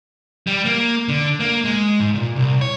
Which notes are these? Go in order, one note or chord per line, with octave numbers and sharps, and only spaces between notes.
G3
A#3
D3
A#3
G#3
G#2
A#2
C2
C#5